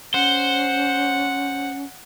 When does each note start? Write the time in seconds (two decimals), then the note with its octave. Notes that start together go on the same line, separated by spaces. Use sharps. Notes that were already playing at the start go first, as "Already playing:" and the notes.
0.14 C#4 C5 F#5